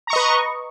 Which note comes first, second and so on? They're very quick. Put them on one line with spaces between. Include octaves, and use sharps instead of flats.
A#5 C#6 D#5 B4